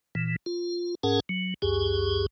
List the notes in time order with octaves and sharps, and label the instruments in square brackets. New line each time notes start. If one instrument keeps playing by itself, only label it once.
[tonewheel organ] A#2 E3
F4
G#2 C#4 G#4 A#4 F#5 A5
F#3
C#2 F#2 G4 G#4